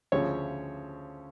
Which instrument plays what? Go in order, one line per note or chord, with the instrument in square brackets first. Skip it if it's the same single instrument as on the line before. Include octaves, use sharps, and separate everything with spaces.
[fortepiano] D2 C#3 F3 C#5